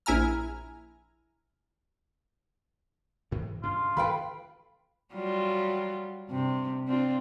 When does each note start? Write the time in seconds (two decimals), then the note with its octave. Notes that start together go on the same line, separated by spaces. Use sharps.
0.06 A#1 E4 G#5 A#5 F6
3.31 D2 G#2 E3
3.63 G2 C#3 D4 F4
3.97 D#3 A4 B4 F5 G5 B5
5.14 F#3 G3 F4
6.29 G2 C3
6.88 C4 D4 F4